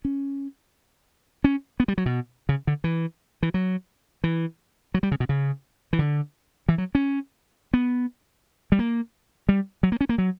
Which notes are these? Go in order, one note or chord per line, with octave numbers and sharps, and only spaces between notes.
C#4
C#4
B3
G3
F#3
B2
C#3
D3
E3
E3
F#3
E3
F#3
G3
C#3
B2
C#3
E3
D3
E3
F#3
C#4
B3
G3
A#3
G3
F#3
A#3
C#4
A#3
F#3